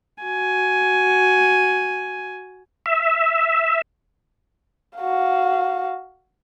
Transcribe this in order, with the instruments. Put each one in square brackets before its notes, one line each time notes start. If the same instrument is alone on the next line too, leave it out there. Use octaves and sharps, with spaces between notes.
[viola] F#4 G#5
[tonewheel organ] E5
[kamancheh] F#4 F5